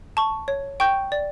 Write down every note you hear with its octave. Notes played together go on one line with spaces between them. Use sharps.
A5 C#6
C#5
G5 C#6 G6
D5